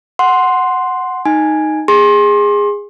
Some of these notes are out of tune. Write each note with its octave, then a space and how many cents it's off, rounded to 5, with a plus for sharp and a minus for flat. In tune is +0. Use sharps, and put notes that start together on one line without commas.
F#5 +0 C6 +0
D#4 +0 G#5 +0
G#4 -20 C6 +30